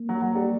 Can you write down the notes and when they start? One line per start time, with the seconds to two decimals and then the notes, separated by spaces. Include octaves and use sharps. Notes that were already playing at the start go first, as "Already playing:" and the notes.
Already playing: A#3
0.09 F#3
0.22 F#3
0.35 G3